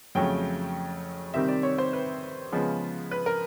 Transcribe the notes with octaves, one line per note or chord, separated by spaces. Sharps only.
F2 C#3 F#3 A3 G5
C3 D#3 G3 C4 E5
D5
C#5
C5
B4
C#3 F3 G#3 B3
B4
A#4